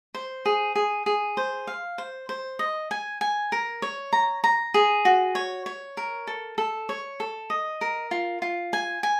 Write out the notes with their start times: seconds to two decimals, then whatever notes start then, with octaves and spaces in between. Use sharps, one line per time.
0.15 C5
0.46 G#4
0.76 G#4
1.06 G#4
1.37 C5
1.67 F5
1.98 C5
2.29 C5
2.59 D#5
2.91 G#5
3.21 G#5
3.52 A#4
3.82 C#5
4.13 A#5
4.44 A#5
4.74 G#4
5.05 F#4
5.35 C#5
5.66 C#5
5.97 A#4
6.27 A4
6.58 A4
6.89 C#5
7.20 A4
7.50 D#5
7.81 A#4
8.11 F4
8.42 F4
8.73 G#5
9.03 G#5